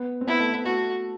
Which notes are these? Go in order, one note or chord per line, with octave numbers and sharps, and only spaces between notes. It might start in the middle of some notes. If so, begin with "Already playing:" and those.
Already playing: B3
C4
B3 E4
A3
B3
A3 F#4